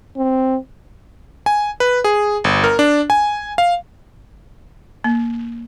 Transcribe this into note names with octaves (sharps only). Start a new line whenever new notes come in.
C4
G#5
B4
G#4
G1
A#4
D4
G#5
F5
A#3